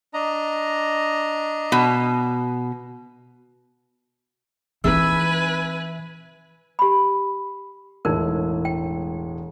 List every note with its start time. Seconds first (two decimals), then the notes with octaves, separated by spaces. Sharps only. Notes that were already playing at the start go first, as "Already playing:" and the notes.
0.14 D4 D#5 A#5
1.72 B2
4.84 E3 C4 D#4 B4 E5 G#5
6.79 G4 B5
8.05 E1 A2 G#3 D#4 A#4
8.65 G5